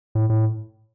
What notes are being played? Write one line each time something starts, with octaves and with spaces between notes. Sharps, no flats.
A2
A2